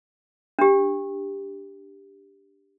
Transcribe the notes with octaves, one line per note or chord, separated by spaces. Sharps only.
D4 G4